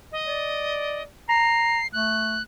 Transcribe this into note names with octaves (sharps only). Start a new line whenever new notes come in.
D#5
D5
A#5 C7
A3 F#6